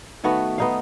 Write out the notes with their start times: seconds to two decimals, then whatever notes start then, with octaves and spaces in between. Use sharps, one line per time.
0.24 D#3 A3 B3 F#4
0.58 B3 D#4 F5